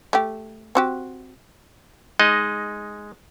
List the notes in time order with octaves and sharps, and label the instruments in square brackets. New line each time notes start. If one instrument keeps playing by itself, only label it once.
[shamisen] A3 G4
C4 F#4 G4
[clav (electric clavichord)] G#3 D#4 D#5